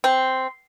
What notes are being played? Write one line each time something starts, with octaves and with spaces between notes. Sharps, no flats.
C4